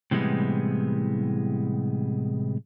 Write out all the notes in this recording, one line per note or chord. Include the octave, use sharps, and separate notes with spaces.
A2 C3 E3 G3 G#3 B3